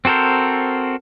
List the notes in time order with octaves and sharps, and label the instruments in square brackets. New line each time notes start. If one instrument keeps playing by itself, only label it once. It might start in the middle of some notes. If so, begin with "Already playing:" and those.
[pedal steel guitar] C4 F#4 A4 A#4 C5